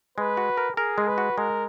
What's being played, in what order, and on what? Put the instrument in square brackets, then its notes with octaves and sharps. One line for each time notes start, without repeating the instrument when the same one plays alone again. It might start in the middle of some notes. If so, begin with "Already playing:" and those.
[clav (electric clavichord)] G#3 [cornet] B4
[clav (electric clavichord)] F#4
A#4
[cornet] G#4 [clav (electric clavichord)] A#4
[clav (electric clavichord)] G#3
[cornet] B4
[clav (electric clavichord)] F#4
[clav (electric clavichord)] G#3 [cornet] A#4